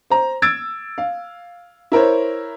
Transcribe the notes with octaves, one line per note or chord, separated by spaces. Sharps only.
C5 A#5
E6 G#6 A6 D7
F5
E4 A#4 C5 C#5